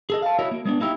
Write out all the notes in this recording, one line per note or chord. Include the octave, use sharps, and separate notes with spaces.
G#4 A4 D#5
F5 A5
E4 F#4 A#4 C#5 D#5
A#3
G#3 B3 D4
A#3 D#4 E4 G4